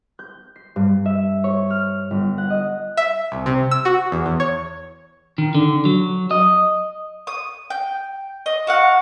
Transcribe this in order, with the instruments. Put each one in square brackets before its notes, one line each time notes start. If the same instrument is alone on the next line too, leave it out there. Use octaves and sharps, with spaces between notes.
[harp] G6
C7
G2
E5
C#5
F6
G1
F#5
D#5
[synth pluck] E5
C2
C3
E6
F#4
E2
E2
C#5
[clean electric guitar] D#3
D3
F#3
D#5
[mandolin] D#6
G5
D#5
F#4 F5 F#5